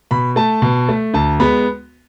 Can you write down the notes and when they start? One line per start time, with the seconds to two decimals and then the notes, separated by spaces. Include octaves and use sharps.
0.11 B2 B5
0.36 A3 A5
0.62 B2
0.89 A3
1.14 D2 A5
1.40 G#3 B3 B5